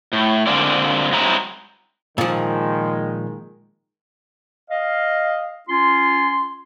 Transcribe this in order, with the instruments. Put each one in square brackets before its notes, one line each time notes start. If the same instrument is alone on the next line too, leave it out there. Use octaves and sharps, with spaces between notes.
[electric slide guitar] A2
D3 G#3 A#3 C4 D5
G2 F#3 G#3 C4 E4 A#5
[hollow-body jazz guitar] A#2 F3 [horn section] D#3 G#3
[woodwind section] D#5 F5
C#4 F4 C6